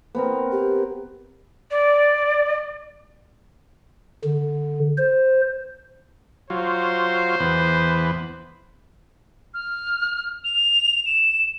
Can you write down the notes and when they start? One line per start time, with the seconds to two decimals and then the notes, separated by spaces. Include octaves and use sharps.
0.15 B3 C4 A#4
0.52 G4
1.71 D5
4.24 D3
4.98 C5
6.50 F#3 F4 C5
7.40 E2 B4
9.54 F6
10.44 F7
11.06 E7